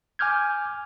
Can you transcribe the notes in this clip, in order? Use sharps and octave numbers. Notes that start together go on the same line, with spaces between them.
G#5 D6 F6 G6 G#6